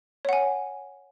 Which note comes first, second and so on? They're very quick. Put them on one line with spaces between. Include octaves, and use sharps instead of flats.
C#5 F#5 G#5